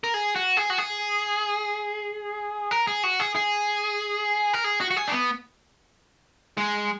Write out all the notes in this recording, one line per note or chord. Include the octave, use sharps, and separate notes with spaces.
A#4
G#4
F#4
G#4
F#4
G#4
A#4
G#4
F#4
G#4
G#4
A#4
G#4
F#4
F#4
G#4
D4
B3
G#3